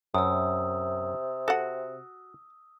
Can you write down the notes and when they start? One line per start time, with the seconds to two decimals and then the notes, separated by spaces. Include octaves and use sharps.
0.14 F#2 C3 D#6 E6
1.48 F#4 A4 F#5